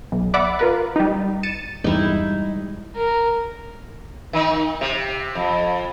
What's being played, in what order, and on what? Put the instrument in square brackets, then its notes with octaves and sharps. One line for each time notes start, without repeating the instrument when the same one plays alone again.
[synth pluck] B1
D5 E5 F#5 B5 D6
F4 A#4 B4
G3 D#4
A6 C#7 D#7 E7
[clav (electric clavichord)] E2 G2 [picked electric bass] G3 G#3 [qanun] D#4 E4
[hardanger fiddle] A#4
[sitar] D#3 D#4
C3
F2